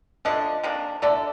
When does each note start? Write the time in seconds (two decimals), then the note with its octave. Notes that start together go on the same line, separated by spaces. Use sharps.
0.25 D3 F3 A3 D4 D#5
0.64 C3 D#3 A#3 D4
1.02 D3 A3 D4 A4 D5